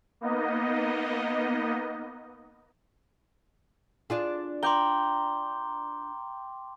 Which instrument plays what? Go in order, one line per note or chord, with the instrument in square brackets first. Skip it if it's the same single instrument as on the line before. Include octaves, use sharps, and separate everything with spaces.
[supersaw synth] A#3 B3 D#4 D#5
[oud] D4 F4 G#4
[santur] G5 A#5 [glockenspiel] C6 D6 G7